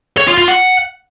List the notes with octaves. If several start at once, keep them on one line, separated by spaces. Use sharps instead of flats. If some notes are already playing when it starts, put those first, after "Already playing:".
C#5
F4
F4
F#5